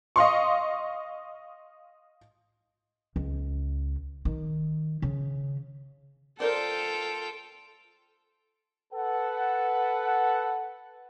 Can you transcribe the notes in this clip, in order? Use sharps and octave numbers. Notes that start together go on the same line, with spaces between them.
D#5 F5 C6 C#6
C#2
D#3
C#3
F4 A4 A#4 C5 D5 G5
A4 B4 F#5